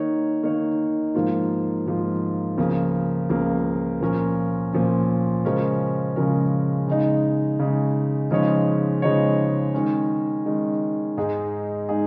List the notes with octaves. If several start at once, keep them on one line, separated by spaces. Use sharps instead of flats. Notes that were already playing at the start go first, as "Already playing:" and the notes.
Already playing: D#3 A#3 D#4 C#5
D#3 A#3 D#4 C#5
G#2 F3 A#3 F4
G#2 F3 A#3 F4
C#2 C#3 F3 A#3
C#2 C#3 F3 A#3
A#2 F3 C#4 A#4
A#2 F3 C#4 A#4
C#3 F3 G#3 C#4 A#4
C#3 F3 G#3 C#4 A#4
C#3 G#3 D#4
C#3 G#3 D#4
C#3 F3 G#3 D#4 C#5
C#3 F3 G#3 D#4 C#5
D#3 G#3 C#4
D#3 G#3 C#4
G#2 G#3 D#4 G#4
G#3 D#4 G#4